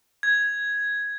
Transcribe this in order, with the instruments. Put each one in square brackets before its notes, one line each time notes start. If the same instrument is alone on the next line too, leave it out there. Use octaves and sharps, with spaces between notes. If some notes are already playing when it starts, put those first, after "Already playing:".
[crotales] G#6